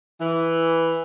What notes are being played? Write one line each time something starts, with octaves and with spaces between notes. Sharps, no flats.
E3